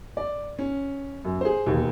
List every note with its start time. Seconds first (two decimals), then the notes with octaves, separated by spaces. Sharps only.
0.17 D5
0.59 C#4
1.25 F#2
1.41 G#4 C5
1.66 E1 D#2